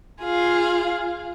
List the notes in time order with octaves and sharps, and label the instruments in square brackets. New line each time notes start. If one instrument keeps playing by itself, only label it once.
[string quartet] F4 G#4 F5